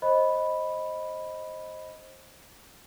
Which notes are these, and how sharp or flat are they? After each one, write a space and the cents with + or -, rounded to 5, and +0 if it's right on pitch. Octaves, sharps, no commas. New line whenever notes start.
C5 +20 D#5 +5 B5 +0